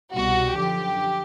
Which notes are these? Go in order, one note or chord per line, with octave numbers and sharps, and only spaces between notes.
C2 B2 G3 F#4
F#2 D3 F3 G4